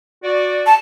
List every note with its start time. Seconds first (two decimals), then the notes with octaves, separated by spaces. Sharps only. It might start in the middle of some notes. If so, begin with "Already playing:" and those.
0.24 F#4 D5
0.67 A5